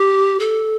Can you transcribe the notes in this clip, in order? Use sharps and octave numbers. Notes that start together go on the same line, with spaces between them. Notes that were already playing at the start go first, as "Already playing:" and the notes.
Already playing: G4
A4